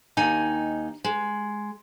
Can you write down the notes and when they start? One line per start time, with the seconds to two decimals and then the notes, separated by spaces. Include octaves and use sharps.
0.17 D#2 D#3 D#4 G#5
1.04 G#3